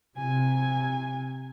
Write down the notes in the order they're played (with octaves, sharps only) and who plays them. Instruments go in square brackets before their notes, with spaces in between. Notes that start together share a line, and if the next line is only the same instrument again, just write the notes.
[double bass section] C3 [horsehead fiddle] G#5